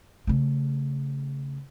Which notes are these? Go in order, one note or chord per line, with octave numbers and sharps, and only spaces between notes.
C#3 A3